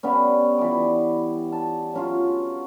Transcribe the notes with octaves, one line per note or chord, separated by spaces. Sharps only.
C#3 G3 B3 C#4
E3 G3 D6
A5
F#3 C#4 F4